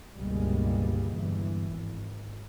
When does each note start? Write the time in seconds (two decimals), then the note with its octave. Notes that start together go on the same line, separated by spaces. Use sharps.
0.17 G1 C#2 B2 G3 G#3 A#3
1.12 G1 E2 E3
1.69 G#1